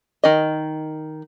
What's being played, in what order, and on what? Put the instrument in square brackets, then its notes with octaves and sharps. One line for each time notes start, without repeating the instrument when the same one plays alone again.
[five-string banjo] D#3 D#5